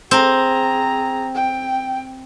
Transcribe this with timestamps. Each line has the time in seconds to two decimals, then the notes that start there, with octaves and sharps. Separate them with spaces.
0.11 C4 G#4 A#5
1.34 G5